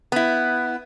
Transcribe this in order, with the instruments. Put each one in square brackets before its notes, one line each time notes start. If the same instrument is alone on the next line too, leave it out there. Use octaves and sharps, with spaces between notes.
[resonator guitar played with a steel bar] B3 E4